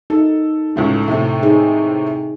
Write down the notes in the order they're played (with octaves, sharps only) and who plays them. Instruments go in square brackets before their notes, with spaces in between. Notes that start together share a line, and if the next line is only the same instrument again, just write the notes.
[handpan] D#4 [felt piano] A4
[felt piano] C#2 A2 A3
A2 C3 A3
[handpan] D#4 G#4